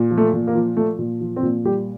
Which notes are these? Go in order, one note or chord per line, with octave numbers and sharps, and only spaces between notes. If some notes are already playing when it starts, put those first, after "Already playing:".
Already playing: A#2
F3
A3
A#2
A#3
F3
F3 A3
A#2
F3
C4
A#2
G3 G4